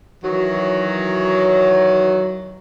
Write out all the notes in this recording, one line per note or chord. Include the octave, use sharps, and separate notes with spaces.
D#3 E3 F#3